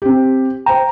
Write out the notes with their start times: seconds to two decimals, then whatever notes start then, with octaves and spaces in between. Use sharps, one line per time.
0.02 C4 G4
0.66 C5 G5 A#5